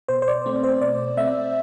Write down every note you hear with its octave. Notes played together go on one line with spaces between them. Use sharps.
B2 C5
C5
D5
A3 C4
C5
B2 D5
A3 C4 E5